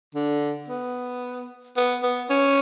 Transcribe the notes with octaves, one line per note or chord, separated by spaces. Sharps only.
D3
B3
B3
B3
C#4